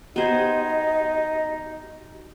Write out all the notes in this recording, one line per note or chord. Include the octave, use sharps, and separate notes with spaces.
B3 D#4 F#4 G4 C5 D#5 G#6